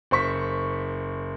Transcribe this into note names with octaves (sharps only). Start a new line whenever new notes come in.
F#1 C5 C#6 B6